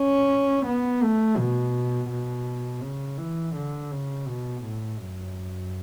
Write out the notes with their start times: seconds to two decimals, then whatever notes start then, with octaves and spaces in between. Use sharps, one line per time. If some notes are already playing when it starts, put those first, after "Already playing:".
Already playing: C#4
0.65 B3
1.02 A3
1.37 B2
2.10 B2
2.82 C#3
3.17 E3
3.55 D3
3.91 C#3
4.27 B2
4.63 A2
4.99 F#2